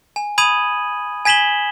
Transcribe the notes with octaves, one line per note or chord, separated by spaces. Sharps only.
G#5
B5 D#6 G#6 D#7 F#7
G#5 G#6 B6 E7 F#7 G7